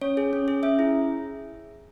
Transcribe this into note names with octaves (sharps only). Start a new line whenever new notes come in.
C#4 C#5
G#4
C#4
G#4
C#4 E5
E4 G#4